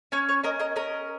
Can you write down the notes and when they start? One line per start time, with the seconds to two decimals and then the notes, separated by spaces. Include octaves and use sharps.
0.12 C#4 C#5
0.29 C#5
0.44 C#4 A#4 D#5
0.60 A#4 D#5
0.76 C#4 A#4 D#5